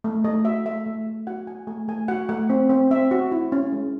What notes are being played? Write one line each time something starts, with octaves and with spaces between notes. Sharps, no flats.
A3
A3 D#5
F#4 E5
A3 E5
A3
A3
F#4 F#5
F#4 G#5
A3 G#5
A3 G#5
F#4 F#5
A3 F#5
C4
C4
C4 E5
F#4
E4
C#4
G#3